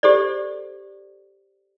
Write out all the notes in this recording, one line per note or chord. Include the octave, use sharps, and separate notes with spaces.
G4 A4 C5 D5